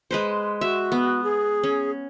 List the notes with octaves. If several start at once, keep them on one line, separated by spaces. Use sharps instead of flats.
G#3 B4 C5
F#4 E5
B3
G#4
C#4